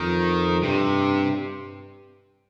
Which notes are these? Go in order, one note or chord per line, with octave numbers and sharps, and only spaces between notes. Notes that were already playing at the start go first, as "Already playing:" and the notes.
Already playing: F2 D#3
G2 C3